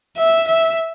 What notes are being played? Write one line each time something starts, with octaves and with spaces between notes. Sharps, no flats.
E5
E5